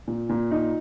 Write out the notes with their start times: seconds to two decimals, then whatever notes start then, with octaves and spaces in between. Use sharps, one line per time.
0.08 A#2
0.29 A#2
0.51 D#4